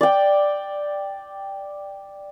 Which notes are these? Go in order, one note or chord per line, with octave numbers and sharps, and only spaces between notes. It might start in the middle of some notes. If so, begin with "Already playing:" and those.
D5 G5